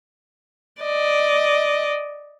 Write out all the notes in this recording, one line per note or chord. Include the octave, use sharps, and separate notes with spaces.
D5 D#5